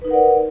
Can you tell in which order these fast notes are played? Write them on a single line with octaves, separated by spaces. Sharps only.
B4 D#4 A#4 F#5 D5